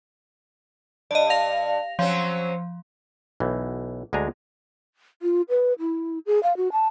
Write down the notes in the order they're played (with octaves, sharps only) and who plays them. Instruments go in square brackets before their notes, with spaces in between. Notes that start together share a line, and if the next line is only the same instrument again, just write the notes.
[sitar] G2 [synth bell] D5 D#5
[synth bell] F5 A#6 F7
[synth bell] F3 [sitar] F#3 C4 C#4
[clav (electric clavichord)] B1 E3
D2 G#3 D4 G#5 A#5
[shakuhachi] F4
B4
E4
G#4
F5
F#4
A5